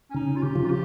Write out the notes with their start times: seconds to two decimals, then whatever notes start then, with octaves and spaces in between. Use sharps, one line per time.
0.10 C#4
0.14 C#3 D#4
0.36 F4
0.42 G4
0.55 C#3 F3
0.65 F4
0.70 G4